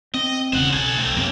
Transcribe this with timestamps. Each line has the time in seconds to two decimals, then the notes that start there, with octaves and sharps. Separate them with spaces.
0.14 C4 D#5
0.53 E1 C#3 C5 F#5
0.73 B1 A4 G#5
0.98 A3 C4
1.17 F#2 C3 A#3 C#4